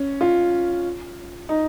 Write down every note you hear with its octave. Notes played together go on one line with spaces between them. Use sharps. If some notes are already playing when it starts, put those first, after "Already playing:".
Already playing: C#4
F4
D#4